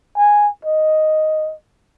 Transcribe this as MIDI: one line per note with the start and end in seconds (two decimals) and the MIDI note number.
0.17 0.48 80
0.65 1.54 75